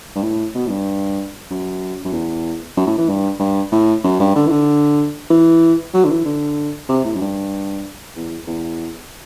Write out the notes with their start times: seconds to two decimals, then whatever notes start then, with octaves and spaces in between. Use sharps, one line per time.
0.16 G2
0.23 A2
0.55 B2
0.67 A2
0.71 G2
1.50 F#2
2.05 F#2
2.13 E2
2.77 F#2
2.87 A2
2.98 E3
3.09 G2
3.40 G2
3.72 A2
4.04 F#2
4.20 G2
4.35 D3
4.47 E3
4.50 D3
5.30 E3
5.94 F#3
6.05 D3
6.10 E3
6.25 D3
6.89 C3
7.05 A2
7.16 F#2
7.21 G2
8.16 E2
8.47 E2